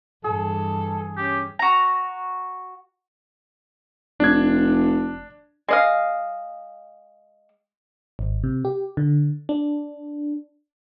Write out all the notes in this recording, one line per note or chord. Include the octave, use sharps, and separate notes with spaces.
G2 E3 G#4 A4
C#4 G4
F#4 A#5
F1 D4 G#6
G#3 D#5 F5
G#1
C3
G4
D3
D4